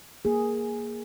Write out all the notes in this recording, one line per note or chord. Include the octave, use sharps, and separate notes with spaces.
A#3 G#4